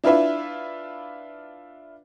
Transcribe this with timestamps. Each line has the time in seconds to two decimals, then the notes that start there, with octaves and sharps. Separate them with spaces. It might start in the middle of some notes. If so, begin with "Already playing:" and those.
0.04 D4 E4 F4 B4 E5